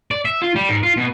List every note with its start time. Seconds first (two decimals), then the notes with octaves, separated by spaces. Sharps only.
0.11 D5
0.25 E5
0.42 F4
0.55 G3
0.69 G#2
0.83 F4
0.97 B2